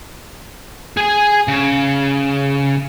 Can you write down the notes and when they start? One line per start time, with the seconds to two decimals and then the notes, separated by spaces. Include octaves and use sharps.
0.97 G#4 G#5
1.48 C#3